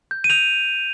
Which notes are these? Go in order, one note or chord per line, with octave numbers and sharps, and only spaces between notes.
G6
D#7
G6 F7